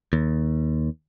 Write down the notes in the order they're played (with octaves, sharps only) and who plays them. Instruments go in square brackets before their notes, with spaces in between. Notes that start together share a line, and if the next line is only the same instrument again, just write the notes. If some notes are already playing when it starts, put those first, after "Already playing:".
[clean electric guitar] D#2